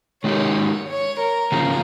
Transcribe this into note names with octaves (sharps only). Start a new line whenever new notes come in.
D#3 G#3 D#4 G4 A#4 C#5
C#5
A#4
C#3 F3 A#3 C#4 G#4